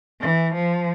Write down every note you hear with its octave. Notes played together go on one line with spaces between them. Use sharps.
E3
F3